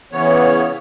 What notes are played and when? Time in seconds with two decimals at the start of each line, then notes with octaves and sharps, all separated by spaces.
0.12 C#3 E3 B3 C#5